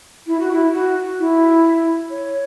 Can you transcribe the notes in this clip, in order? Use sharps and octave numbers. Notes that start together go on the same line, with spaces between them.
E4
F#4
E4
F#4
E4
C#5